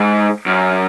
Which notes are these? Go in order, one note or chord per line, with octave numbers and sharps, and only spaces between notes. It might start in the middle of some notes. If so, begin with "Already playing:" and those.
Already playing: G#2
F#2